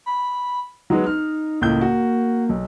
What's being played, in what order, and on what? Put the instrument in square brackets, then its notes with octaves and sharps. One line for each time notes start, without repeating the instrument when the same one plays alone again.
[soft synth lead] B5
[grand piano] F#3 G#3 B3 [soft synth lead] D#4
[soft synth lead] D#4 [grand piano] F6
[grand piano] C#2 A2 G6 [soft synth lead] A#3
[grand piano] F#4
B1